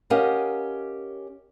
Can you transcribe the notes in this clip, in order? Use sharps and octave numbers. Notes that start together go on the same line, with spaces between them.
C#4 G4 A#4 D#5 F5 F#5